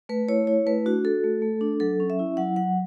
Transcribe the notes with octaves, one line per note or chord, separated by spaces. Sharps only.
A3 B4
E4 C#5
E4 C#5
A3 B4
D4 F#4
F#4 A4
A3
A3
D4
F#3 A4
C#4
E5
E4
F#3 F#5
F#3 F#5